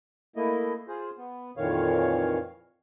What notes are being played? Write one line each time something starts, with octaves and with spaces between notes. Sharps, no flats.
A3 A#3 E4 D#5
F4 G#4 C5
B3
F2 A#2 D#3 E3 C#5 F5